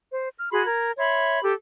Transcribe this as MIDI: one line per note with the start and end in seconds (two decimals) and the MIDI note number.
0.11 0.28 72
0.38 0.49 89
0.51 0.64 66
0.51 0.64 68
0.51 0.64 83
0.51 0.64 84
0.65 0.91 70
0.65 0.91 92
0.98 1.41 73
0.98 1.41 76
0.98 1.41 83
0.98 1.41 84
1.42 1.53 67
1.42 1.53 69